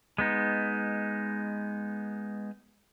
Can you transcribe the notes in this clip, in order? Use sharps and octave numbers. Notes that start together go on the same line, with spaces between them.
G#3 B3 D#4